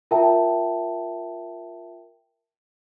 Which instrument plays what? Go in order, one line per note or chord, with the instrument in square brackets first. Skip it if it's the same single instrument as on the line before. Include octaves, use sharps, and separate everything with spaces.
[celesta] F4 A#4 E5 G5 A5